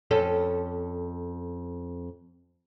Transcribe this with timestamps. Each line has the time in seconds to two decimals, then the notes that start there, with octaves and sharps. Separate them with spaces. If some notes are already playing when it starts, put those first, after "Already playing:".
0.11 F2 C#4 A4